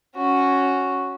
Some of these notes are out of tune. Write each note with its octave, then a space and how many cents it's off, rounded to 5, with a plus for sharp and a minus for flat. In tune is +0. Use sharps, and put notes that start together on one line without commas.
C#4 +0 F#4 +0